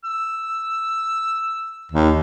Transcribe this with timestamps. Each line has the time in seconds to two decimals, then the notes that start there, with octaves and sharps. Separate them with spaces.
0.05 E6
1.92 D#2